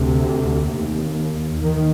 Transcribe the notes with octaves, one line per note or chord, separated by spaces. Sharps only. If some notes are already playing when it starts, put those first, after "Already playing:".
Already playing: D2 C3
D#2
D#2 D#3